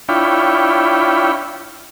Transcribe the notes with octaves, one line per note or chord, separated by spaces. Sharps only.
D4 E4 F4 C#5 G5 B5